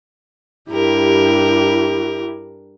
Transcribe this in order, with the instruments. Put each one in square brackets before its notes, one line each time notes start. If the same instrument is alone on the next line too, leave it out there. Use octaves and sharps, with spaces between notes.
[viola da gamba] G2 A#4 [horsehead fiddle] E4 G4